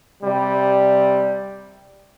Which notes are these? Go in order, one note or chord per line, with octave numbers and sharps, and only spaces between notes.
C3 G3